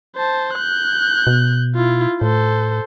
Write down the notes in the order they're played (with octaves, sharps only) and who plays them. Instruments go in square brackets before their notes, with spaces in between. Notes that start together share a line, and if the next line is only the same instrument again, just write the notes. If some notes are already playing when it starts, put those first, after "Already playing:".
[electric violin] C5 A5
F#6 G6
[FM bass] B2
[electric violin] E4 F4
[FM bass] A2 [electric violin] A4 C5